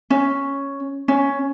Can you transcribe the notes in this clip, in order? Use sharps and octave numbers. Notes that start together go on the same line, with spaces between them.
C#4
C#4